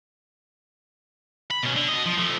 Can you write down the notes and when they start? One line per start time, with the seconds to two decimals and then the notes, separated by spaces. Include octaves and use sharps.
1.51 B5
1.63 B2 C#4
1.76 D3
1.89 B2 D#5
2.06 F3
2.18 F3 A3